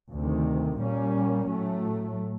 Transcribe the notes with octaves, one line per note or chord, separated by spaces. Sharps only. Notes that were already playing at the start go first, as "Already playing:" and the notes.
D2 C3 D#3
A#2 G3 A#3 C#4
A2 F#3 A3